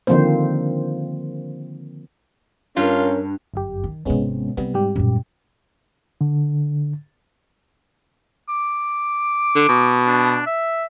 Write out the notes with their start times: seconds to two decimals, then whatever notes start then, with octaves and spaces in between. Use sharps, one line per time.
0.07 D3 D#3 F3 A#3 C4 C5
2.77 G2 C#4 F4 A#4
3.54 G1 F#2 G4
3.84 D#3
4.05 G#1 C3 G#3 B3 C#4
4.57 C3 G3 B3 C4
4.74 G#2 G3 G4
4.96 F#2 A#2
6.21 D3
8.49 D6
9.55 D3
9.69 B2
10.07 D4
10.47 E5